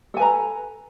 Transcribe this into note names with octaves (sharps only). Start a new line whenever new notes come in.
A4 B4 G#5 A#5